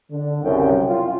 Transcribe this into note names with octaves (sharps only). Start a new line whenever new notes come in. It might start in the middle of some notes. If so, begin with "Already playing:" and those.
D3
C2 F#2 C#3 G5
F4